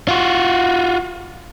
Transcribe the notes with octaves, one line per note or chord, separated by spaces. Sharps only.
F4 F#4